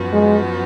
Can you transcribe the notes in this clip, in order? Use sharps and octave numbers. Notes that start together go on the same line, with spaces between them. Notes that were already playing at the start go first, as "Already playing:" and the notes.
Already playing: F#2 F3 B3 F#4
G#3